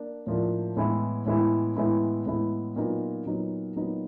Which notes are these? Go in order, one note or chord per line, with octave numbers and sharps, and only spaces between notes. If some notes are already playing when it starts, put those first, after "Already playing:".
Already playing: A#3 D4
A2 F3 A#3 D4
A2 E3 G#3 B3 E4
A2 E3 G#3 B3 E4
A2 E3 G#3 B3 E4
A2 E3 G#3 B3 E4
A#2 F#3 B3 D#4
A#2 F#3 B3 D#4
A#2 F#3 B3 D#4